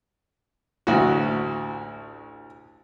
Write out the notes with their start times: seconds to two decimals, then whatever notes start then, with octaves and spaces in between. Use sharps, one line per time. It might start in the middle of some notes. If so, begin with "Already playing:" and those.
0.87 A1 D2 F#4